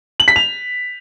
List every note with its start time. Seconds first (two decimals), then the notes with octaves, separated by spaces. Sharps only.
0.20 F#7
0.28 B6
0.36 F7